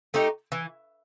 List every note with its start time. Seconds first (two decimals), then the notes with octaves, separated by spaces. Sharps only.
0.14 A3 D#4 G4
0.52 E3